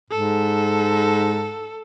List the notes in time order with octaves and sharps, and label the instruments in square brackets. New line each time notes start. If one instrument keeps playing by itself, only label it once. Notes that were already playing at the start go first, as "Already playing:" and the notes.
[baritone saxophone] G#2 [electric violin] A4